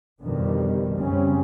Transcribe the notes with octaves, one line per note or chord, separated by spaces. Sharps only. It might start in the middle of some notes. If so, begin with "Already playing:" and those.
F2 B2 D3 D#3 G3
F#2 C#3 G3 C4 C#4